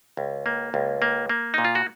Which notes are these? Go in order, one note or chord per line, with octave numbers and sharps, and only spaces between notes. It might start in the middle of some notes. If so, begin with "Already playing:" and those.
C#2
A#3
C#2
A#3
A#3
A#2 D#4
F4
F#4